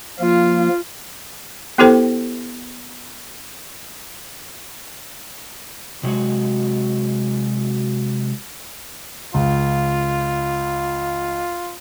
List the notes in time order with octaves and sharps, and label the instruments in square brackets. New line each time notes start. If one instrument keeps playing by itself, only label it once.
[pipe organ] F3 A#3 [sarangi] F4
[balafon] B3 E4 G4 A4 C5 G5
[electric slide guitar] C3 F#3 G#3 F#4
[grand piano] C#2 [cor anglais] F4